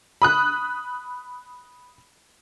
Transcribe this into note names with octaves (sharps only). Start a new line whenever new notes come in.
B5 D#6 F#6